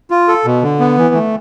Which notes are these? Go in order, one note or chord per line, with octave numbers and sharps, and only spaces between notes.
F4
A4
B2
D3
B3
E3
A3